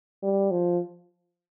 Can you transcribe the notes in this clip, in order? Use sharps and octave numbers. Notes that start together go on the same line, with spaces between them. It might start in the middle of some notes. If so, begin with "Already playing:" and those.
G3
F3